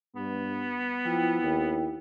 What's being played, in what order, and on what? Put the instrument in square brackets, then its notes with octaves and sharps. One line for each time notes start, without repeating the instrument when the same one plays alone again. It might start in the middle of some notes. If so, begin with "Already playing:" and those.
[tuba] G2 [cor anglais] B3
[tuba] F3 [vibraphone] E4 G5
[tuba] D#2